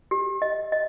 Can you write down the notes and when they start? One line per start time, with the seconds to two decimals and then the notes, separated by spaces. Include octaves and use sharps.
0.11 G4
0.42 D#5
0.72 D#5